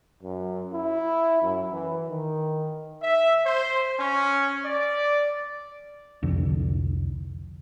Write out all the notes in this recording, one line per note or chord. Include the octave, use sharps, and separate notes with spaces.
F#2
E4
F#2
E3
D#3
E5
C5
C#4
D5
C2 F2 D3